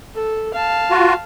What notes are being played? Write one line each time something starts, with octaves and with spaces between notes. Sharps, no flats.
A4
F5 A5
F4 F#4